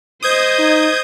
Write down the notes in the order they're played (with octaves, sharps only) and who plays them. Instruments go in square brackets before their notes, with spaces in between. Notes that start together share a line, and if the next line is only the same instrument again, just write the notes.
[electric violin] C5 D#5 [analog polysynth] D#6 G6 G#6
[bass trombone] D#4